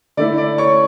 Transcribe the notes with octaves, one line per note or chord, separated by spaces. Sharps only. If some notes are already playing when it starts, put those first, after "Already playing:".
D3 A3 E4 D5
D5
C#5 C#6